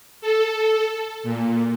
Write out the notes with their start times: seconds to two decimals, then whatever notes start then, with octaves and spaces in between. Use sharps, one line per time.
0.21 A4
1.23 A#2